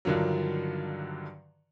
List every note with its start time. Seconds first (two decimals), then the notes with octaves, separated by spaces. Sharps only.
0.05 G2 D3 D#3 F3 F#3